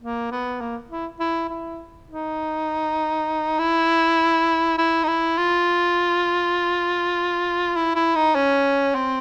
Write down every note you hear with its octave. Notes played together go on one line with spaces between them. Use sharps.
A#3
B3
A#3
E4
E4
E4
D#4
E4
E4
D#4
E4
F4
E4
E4
D#4
C#4
C4